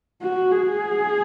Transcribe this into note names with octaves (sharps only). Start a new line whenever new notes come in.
F#4
G#4